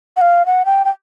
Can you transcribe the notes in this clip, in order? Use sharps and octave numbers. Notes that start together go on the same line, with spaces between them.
F#5
F5
F#5
G5
G5